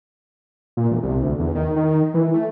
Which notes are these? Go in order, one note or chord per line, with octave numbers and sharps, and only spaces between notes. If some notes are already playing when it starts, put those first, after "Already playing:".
A#2
E1
C2
D2
E2
D#3
D#3
E3
A3